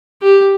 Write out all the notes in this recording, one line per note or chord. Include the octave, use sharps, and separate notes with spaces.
G4